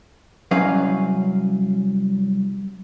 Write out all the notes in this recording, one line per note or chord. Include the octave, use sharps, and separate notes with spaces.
C2 F#3 C#4 B4 F5